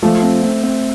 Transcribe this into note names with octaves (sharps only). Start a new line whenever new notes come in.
F3 A3
C4
C4
C4